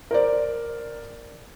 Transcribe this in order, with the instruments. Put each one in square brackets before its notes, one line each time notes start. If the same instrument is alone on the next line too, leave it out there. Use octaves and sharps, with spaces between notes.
[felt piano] A#4 C5 D5